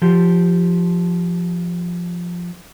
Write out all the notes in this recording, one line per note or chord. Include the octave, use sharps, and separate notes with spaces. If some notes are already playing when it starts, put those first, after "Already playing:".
F3 G4